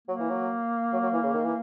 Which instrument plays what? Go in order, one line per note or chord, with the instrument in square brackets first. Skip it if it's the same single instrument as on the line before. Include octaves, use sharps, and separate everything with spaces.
[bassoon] F#3 [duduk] A#3
[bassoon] E3
F#3
F#3
F#3
E3
C#3
D#3
E3